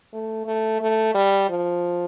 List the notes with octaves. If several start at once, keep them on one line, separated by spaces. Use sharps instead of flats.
A3
A3
A3
G3
F3